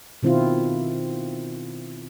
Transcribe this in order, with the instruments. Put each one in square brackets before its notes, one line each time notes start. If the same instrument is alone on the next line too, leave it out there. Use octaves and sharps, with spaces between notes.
[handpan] B2 D#3 C4 E4 F4